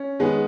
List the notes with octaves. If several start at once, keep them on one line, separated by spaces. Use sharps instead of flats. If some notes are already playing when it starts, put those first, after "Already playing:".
Already playing: C#4
D#3 G#3 B3